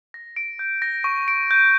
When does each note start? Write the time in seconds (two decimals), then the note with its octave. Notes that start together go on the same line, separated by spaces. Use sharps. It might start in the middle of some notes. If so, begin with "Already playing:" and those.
0.14 A#6
0.36 D7
0.59 G6
0.82 A#6
1.04 C#6
1.28 D7
1.51 G6